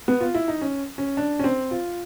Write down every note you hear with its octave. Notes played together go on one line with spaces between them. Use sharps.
B3
F4
E4
D#4
C#4
C#4
D4
C#4
C4
F4